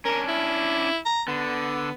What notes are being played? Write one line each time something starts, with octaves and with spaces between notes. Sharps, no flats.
C#4 D4 A#4
E4
A#5
D3 B3